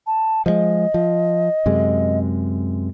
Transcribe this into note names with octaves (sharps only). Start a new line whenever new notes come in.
A5
F3 F#3 G#3 D#5
F3
F#2 C3 G#3